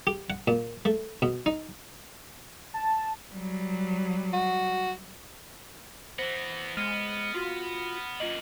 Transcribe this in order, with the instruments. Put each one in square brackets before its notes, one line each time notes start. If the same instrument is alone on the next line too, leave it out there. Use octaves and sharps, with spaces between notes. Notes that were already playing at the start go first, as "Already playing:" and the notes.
[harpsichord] G4
F#5
A#2
A3
B2
D#4
[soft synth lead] A5
[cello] F#3 G3
[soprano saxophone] F#4
[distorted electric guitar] E3 B3 [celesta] C5 [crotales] A#6
[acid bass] G#3 [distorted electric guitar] B3 [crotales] F6 D#7 G7
[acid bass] F4 [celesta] F#4
[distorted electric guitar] F#2 A#2 [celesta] F4 D#5 [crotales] F#7